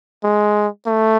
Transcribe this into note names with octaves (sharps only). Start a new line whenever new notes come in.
G#3
A3